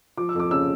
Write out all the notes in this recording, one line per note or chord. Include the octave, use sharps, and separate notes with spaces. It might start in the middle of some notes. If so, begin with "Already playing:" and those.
F3 D6
E6
F2 D6
C#3 E6